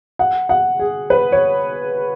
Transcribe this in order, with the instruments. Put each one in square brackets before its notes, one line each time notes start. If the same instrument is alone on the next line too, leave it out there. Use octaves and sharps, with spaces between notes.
[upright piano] F#5
F#5
G#4
B4
C#5